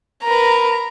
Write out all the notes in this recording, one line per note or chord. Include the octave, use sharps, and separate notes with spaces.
A#4 B4 A#5